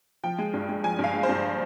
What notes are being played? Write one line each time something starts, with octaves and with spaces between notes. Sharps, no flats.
F3 G5
G#3
G2
G#3
F3 G#5
G2
F5
G#3
C5
G2